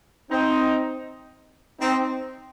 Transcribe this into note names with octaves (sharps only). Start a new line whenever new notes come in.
C4 D#4
C4 D#4